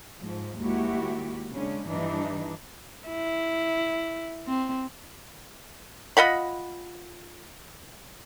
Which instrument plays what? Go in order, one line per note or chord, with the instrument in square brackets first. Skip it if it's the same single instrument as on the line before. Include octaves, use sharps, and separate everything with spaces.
[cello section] G#2 F3
D#2 G#3 A#3 E4 F#4 G4
C#3 G#3 C#4 D4
G2 E3 D4 D#4
[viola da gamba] E4
C4
[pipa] F4 D#5 F#5 B5